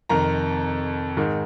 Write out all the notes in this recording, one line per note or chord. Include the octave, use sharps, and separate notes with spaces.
F2 C3 D#3 A#5
G#2 D#3